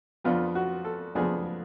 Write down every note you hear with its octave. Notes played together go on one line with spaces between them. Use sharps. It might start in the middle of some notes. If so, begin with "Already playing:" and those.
F2 F3 B3 D4 F4
F#4
A4
F2 F3 B3 D4 G#4